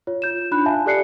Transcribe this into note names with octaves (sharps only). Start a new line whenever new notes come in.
F4 C#5
F4 G6 E7
D4 D#4 F4 B5 F#6
E5 F5 G#5 A5
G4 A4 D5 F#6 C7 C#7